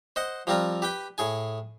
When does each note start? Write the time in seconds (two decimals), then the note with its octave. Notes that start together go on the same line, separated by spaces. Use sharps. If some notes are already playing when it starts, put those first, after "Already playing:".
0.16 C5 D#5 F#5
0.47 F3 G3 C4 F4 A#4
0.82 G4 B4 G5
1.18 A2 G#4 G#5